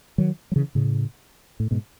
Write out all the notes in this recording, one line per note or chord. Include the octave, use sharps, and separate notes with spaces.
D#3 F#3
F#3
C#3 E3
A2 C#3
A2
G#2 B2